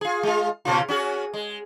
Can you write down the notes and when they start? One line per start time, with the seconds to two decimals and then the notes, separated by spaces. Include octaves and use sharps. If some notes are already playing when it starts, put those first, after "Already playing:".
0.01 F4 G#4
0.23 G#3 F4
0.65 A#2 C#3 F4
0.88 C#4 F#4 G#4
1.34 G#3